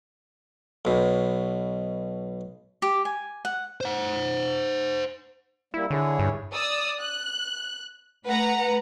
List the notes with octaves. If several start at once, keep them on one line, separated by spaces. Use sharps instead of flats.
B1 B2
G4
G#5
F#5
C5 F#5
G3 A#3 E4
D3 E4 G#4 C#5
G2
D5 D#6 E6
F#6
A3 B4 F#5 A#5